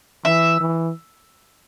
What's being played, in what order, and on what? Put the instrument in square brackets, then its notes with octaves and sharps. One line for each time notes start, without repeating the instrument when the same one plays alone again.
[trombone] E3 [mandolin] E5
[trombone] E3